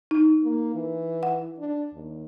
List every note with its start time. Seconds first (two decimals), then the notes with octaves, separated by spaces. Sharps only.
0.11 D#4
0.43 A#3
0.74 E3
1.23 F#5
1.59 D4
1.94 D#2